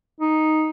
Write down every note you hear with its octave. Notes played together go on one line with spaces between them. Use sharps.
D#4